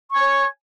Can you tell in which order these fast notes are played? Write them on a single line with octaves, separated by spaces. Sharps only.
C#6 G#5 C#5